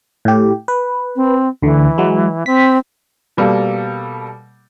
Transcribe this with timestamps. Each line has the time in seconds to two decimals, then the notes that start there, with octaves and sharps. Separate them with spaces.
0.25 A2 G4
0.68 B4
1.16 C4
1.63 D2 D3 E3
1.98 F#3 G#3
2.46 C4 B6
3.37 B2 G3 A#3 A4